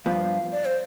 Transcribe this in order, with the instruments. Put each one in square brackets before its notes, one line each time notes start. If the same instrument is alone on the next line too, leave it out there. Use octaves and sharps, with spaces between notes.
[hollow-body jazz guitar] G2 F3 B3 [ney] F5
[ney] D5
C5